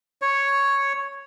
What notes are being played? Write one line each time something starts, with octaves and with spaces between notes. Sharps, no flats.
C#5